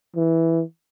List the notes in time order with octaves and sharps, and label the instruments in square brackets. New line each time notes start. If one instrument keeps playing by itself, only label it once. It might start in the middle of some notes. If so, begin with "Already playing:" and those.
[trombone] E3